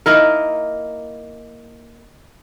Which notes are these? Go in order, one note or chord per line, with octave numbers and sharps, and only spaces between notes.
A#3 D#4 E4 A#4